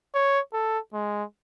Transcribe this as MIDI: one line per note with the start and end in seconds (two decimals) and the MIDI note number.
0.15 0.40 73
0.53 0.79 69
0.94 1.24 56